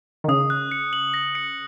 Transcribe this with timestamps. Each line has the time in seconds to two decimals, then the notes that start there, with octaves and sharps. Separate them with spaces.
0.24 D#3
0.28 C#3 D#6
0.50 F#6
0.71 C#7
0.93 F#7
1.14 A#6
1.35 C#7